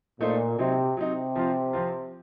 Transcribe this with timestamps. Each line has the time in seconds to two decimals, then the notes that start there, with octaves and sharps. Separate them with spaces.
0.20 A#2 A3 D#4 A4 C5
0.59 C3 F#3 C4 D#4
0.97 C3 F#3 C4 D#4
1.36 F3 C4 F4
1.73 F3 C4 F4